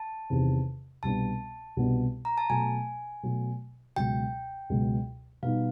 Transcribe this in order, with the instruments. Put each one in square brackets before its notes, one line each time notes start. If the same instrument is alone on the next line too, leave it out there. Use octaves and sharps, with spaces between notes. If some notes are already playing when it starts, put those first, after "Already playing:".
Already playing: [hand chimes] A5
[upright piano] E2 C3 D#3
[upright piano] C2 B2 G3 B3 D4 [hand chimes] A5
[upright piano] C2 B2 G3 B3 D4
[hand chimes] A#5
A5
[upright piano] B2 F#3 A3 [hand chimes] G#5
[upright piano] B2 F#3 A3
[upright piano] C#2 B2 F#3 [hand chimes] G5
[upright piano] C#2 B2 F#3
[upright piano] B2 G3 B3 D#4 [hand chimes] F5